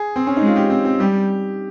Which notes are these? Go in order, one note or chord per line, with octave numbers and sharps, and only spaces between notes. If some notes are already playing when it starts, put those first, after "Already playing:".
Already playing: G#4
C4
C#4
D#4
G#3 F4
G4
C4
C4
G3 G4